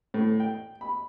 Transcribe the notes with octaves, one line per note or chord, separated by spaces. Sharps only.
A2
G5
B5